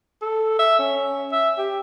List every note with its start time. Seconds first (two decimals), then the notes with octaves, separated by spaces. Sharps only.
0.21 A4
0.59 E5
0.79 C#4
1.32 E5
1.58 G4